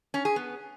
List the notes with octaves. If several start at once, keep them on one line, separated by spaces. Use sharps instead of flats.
C#4
G#4
B3